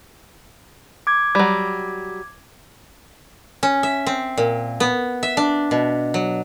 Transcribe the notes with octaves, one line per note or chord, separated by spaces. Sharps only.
D6 G#6
F#3 G3
C#4
E5
C4
A#2
B3
E5
D4
B2
F#3